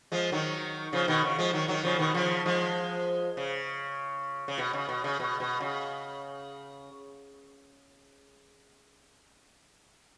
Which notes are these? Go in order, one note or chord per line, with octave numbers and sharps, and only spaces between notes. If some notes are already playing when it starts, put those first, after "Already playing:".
F3 G#3
D#3 F#3
C#3 F3
B2 D#3
C#3
F3 G#3
D#3 F#3
D#3 F#3
C#3 F3
B2 D#3
C#3 F3
F3 G#3
C#3
C#3
B2
C#3
B2
C#3
B2
B2
C#3